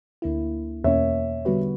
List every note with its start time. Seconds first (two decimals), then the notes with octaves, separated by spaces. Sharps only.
0.22 D2 D3 A#3 E4
0.84 E2 B2 A#3 C#4 C#5 E5
1.45 D3 G3 B3 F#4 B4